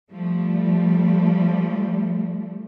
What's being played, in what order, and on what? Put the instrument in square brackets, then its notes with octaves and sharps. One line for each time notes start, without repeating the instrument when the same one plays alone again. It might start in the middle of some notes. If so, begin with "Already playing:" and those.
[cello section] F3 G3 A3